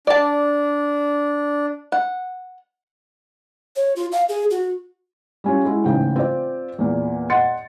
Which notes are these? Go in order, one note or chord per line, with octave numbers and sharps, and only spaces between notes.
D4 D5 A5
F#5
C#5
F4
F5
G#4
F#4
G3 C#4 F4
G#3 E4 F#4
A1 G#2 C#3 G5
C4 F4 D5
E2 A#2
D#5 F#5 C6 A6 C#7